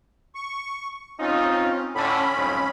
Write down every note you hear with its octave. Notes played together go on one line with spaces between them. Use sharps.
C#6
C4 C#4 D#4 F4
A2 D3 C#4 B5
B1 F2 G#2